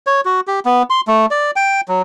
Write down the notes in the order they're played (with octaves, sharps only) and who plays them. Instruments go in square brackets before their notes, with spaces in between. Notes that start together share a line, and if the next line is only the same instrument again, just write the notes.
[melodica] C#5
F#4
G4
B3
C6
A3
D5
G5
F#3